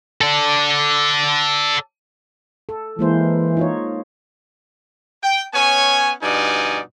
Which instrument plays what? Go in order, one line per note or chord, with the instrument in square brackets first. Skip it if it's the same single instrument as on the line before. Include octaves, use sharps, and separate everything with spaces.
[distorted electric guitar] A4 D5
[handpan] A4
[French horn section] E3 [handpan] G#3 A#3 C5
[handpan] D#4 F4 C#5
[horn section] G5
B3 C#4 C#5 G#5
G2 B2 F3 D#4 D5 G#5